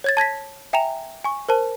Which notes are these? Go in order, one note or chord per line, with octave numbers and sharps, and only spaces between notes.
C#5 G#6 A6
A5 G#6 A#6 B6
E5 G5 G#5 A#5 F7
G#5 C#6
A#4 C5 A5